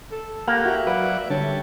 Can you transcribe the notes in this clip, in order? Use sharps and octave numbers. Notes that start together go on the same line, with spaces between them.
A4
A#3 G4 F5 F#5
F#4 E5
F#3 B4 D5 F#5
D3 G3 C#5 A5